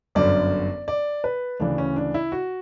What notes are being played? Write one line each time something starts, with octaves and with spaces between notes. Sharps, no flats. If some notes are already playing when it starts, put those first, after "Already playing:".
G1 F#2 D3 D5
D5
B4
D2 C#3 E3 D4
C#4
D4
E4
F#4